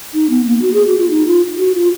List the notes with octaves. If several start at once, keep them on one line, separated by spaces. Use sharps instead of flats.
D#4
B3
A#3
F#4
G#4
F#4
F4
D#4
F4
F#4
F4